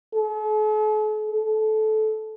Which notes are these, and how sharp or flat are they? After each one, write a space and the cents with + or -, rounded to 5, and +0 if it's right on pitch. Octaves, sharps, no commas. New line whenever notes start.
A4 -45
A4 -20